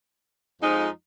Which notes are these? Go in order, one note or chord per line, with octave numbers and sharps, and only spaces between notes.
F2 F3 G#3 D#4